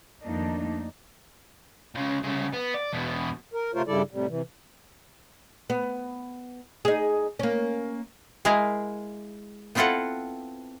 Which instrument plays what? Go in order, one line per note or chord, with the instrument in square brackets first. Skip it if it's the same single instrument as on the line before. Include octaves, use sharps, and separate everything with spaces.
[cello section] F2 D#3 A3 A#3 D4 D#4
[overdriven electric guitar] C#2 C#3
C2 C#3
B3
D5
E2 B2
[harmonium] A#4
C3 A3 F4 A#4 C5 C#5
G2 C#3 G3 E4 A4 D5
A2 C3 G3
C3 E3
[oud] B3
D#4 G#4
A#3 C#4
[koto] G#3 E4 G#4 A#4 F5
B3 C4 E4 F4 A4 F#5